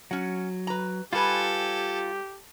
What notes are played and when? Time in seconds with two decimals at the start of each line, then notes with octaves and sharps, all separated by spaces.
0.11 F#3 C#4 F#5
0.67 B4 A#5
1.13 G3 F4 G4 A4 B4 G#5